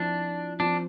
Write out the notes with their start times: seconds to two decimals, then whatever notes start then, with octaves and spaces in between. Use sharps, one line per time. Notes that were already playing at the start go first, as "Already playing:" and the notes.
Already playing: F3 C4 D4 E4
0.60 F3 C4 D4 F4